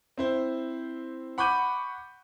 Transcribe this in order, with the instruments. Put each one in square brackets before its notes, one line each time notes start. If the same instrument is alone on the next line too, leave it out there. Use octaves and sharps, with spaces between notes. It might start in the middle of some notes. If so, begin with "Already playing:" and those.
[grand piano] C4 E4 C5
F#5 B5 C#6 D6 G6 D#7